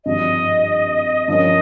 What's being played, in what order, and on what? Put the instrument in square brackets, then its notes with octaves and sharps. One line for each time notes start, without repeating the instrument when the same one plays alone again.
[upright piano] G#1 G2 F3 [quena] D#5
[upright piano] G2 F3 A#3 C#4 [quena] D#5